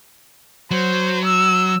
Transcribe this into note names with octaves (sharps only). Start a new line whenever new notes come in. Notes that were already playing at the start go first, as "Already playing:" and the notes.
F#3 C5
E6